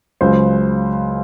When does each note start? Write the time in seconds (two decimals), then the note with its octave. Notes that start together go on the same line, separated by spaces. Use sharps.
0.21 C#2 C#3 F#3 C5